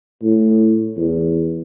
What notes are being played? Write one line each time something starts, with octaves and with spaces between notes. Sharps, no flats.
A2
E2